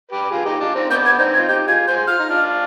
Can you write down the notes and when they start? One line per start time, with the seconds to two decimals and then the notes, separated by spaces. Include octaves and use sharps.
0.12 G4 B4
0.31 F4 G#4
0.45 D#4 G4
0.60 D4 F4
0.75 C4 D#4
0.90 B3 D4 G6
1.05 G#6
1.18 C4 D#4 G6
1.33 G#6
1.37 F4
1.48 D#4 G4 G6
1.67 F4 G#4 G#6
1.87 G#4 C5 G6
2.07 F4 F6
2.19 D#4
2.29 D4 F4